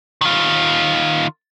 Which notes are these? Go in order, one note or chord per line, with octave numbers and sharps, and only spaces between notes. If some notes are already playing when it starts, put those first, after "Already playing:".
D#3 F4